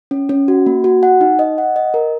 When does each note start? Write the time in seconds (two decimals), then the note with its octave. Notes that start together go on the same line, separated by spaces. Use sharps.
0.11 C#4
0.29 C#4
0.48 F#4
0.66 A#3
0.84 F#4
1.03 F#5
1.21 D#4
1.39 D#5
1.58 F#5
1.76 D#5
1.94 A#4